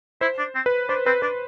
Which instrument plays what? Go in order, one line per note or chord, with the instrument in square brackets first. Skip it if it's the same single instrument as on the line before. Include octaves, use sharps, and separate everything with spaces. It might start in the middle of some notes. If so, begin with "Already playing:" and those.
[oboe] E4 [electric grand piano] C5
[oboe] D4
C4
[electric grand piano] B4
[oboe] D4 [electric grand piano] C5
[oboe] C4 [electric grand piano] B4
[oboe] D4 [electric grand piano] B4